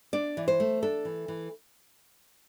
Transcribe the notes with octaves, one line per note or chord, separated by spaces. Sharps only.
D4 D5
E3
C5
A3
D4 A4
E3
E3